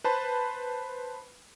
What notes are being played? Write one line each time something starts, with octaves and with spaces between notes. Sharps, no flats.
B4 C5 A5 B5